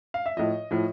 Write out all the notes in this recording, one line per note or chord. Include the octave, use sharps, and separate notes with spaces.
F5
E5
A2 F3 D#5
A2 F3